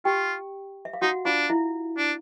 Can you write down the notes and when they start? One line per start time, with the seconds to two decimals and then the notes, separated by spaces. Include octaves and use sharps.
0.05 F4 G4 G5
0.85 E5
0.93 F5
1.02 D#4 F#4 F#5
1.25 D4 F4 F5
1.50 E4 E5
1.98 D4